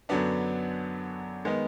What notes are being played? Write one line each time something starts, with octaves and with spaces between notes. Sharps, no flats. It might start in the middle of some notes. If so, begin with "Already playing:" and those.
F#2 D3 F#3 B3 D4
D#3 G#3 B3 D#4